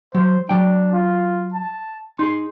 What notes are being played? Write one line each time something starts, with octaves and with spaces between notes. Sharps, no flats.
F#3 C5
F#3 D4 G5
F4
A5
D#4 G#4 C6